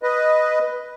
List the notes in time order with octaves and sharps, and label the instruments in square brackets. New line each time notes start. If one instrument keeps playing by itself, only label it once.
[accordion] B4 D#5